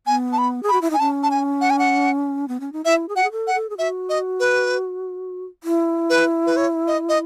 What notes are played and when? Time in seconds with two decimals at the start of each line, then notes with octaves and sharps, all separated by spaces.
0.07 B3 G#5
0.32 A5
0.38 B5
0.63 G#4
0.69 F#4 B5
0.81 E4
0.90 D#4 G#5
1.00 C#4 A5
1.23 A5
1.31 G#5
1.61 F#5
1.70 G#5
1.79 F#5
2.48 B3
2.60 C#4
2.73 D#4
2.85 E4 E5
3.09 G#4
3.16 F#4 F#5
3.23 G#4
3.32 A4
3.47 F#5
3.55 A4
3.70 G#4
3.78 F#4 E5
4.09 D#5
4.40 B4
5.64 E4
6.10 B4
6.46 B4
6.57 C#5
6.87 D#5
7.09 D#5